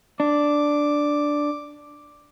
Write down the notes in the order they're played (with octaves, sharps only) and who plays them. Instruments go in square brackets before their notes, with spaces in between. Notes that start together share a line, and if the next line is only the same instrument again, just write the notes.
[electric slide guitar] D4 [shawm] D6